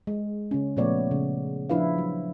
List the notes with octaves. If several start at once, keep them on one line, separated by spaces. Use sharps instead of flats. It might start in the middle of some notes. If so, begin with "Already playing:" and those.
G#3
C#3 C#4
A#2 F3 A3 B3 C#5 D5
C#3
F3 D4 E4 B4 F5
F#3